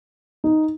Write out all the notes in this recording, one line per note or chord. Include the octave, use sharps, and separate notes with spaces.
D#4